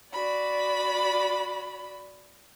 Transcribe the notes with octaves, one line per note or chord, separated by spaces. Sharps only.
F#4 D5 B5